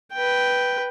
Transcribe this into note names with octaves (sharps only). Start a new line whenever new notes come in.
B4 G5